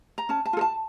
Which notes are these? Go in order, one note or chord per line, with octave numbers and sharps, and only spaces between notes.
A#5
C#4 A5
A5
F4 A4
A5